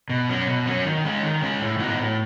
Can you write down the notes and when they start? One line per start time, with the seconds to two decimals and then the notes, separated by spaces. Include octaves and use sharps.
0.10 B2
0.29 F#3 C#4
0.47 B2
0.66 F#3 C#4
0.86 D#3
1.04 G#3 C#4 G#4
1.22 D#3
1.41 G#3 C#4 G#4
1.60 A2
1.79 E3 B3 D#4 F#4
1.97 A2